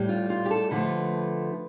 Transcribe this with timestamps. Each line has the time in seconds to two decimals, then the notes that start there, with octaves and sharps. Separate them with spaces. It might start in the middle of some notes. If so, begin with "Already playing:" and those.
Already playing: A2 G3
0.09 F4
0.30 F4
0.46 G4
0.51 A4
0.71 D3 F3 A3 B4